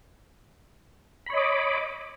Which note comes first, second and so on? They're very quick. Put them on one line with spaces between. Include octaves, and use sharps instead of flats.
B5 C#5 D#5 D6